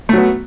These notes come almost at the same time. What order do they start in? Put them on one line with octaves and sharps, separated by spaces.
A3 F#3 B3